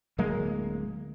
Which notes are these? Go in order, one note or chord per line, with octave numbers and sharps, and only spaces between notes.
D1 F#3 G#3 A#3